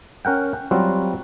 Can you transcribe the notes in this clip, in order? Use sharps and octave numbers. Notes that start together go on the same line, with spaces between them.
C#4 A#4 F#5 G5
F#3 G3 C4 F4 F#4